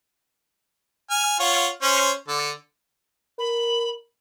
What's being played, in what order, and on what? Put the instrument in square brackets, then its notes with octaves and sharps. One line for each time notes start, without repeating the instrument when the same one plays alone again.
[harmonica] G#5 F6
F4 C#5 F#5
C#4 C5 C#5
D3 A4
[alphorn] A#4 [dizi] B5